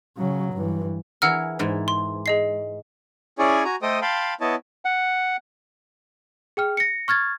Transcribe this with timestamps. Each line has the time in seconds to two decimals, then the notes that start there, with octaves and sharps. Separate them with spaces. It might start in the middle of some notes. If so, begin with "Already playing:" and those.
0.17 C#3 F#3
0.53 G2 E3
1.22 E3 G#4 A#4 F#5 E6 F6
1.59 G#2 E3
1.88 C6
2.26 G#4 D#5 C7
3.39 C#4 E4 G#4 C#5 D5 G#5
3.65 F#4 G#5 A#5
3.82 A3 A4 C5 D#5 G5 D#6
4.02 F5 G5 A5 B5 C6
4.41 B3 E4 C#5 D#5 A5
4.85 F#5
6.57 G#4 G5 F6
6.77 A#6 C#7
7.08 C#6 F6 G#6 A6